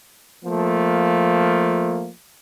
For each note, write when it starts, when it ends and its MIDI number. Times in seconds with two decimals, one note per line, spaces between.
0.44 2.10 53
0.44 2.10 57
0.44 2.10 58